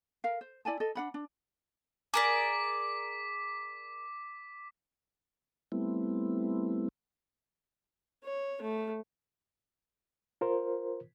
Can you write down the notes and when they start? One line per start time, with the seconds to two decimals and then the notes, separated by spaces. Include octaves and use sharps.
0.24 A#4 F5
0.41 C5
0.65 E4 D5 G#5 A5
0.80 A4 D#5
0.95 D4 F#5 B5
1.14 D4
2.14 G#4 A#4 D5 D6 B6
5.72 G3 A3 B3 C4 E4
8.25 C#5
8.62 A3
10.41 F4 A#4 C5